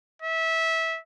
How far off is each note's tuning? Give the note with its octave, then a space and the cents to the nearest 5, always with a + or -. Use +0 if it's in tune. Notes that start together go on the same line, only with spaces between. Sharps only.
E5 -20